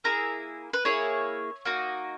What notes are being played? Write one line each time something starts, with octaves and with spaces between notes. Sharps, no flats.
A#3 E4 G#4 A#5
B4
A#3 E4 G#4 C#5
A#3 D#4 F#4